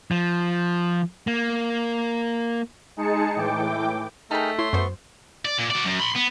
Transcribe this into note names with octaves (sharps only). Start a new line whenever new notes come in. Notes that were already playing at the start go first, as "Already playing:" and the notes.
F3
A#3
G#3 D#4 G#4 A5 C#7
A2 E3 G5 D6
A3 D#4 G#4 A#4 G5 A5 A#5
E4 C#5 C6
F#2 B3 C5 C#6
D5
A#2
F#4 D5
F#2
B5 C6
B3